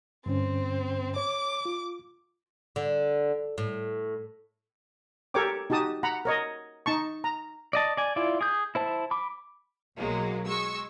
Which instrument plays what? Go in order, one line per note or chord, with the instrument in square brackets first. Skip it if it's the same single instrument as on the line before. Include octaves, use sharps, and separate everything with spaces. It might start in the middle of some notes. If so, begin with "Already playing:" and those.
[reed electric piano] G2 D3 C#4 [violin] C4
[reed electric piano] C#5 [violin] D6
[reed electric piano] F4
[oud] D3
A2
[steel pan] G4 A4 A#4 C#5 G5 D6
D#4 F#4 G4 A5 D#6
F#5 A#5 B5
A#4 C#5 D#5
D#4 A5 C#6
A#5
[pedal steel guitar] D5 D#5 A5
D5 G#5
E4 F4 D5
G#4 D#6 G6
E4 C5 A5
B5 D6
[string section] B1 F#3 G#3 A#3
G#3 C#6 E6